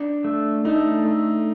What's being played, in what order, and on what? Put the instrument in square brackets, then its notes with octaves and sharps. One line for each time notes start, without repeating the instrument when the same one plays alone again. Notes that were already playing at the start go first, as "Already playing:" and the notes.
Already playing: [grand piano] D4
[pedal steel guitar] A3
[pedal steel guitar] A3 [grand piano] D#4
[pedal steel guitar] A3